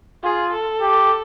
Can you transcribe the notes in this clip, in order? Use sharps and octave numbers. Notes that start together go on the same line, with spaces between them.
F4 G#4
A4
G4